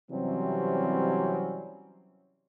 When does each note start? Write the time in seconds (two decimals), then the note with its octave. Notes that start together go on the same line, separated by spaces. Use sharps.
0.11 C3 E3 F#3 G3 C4 C#4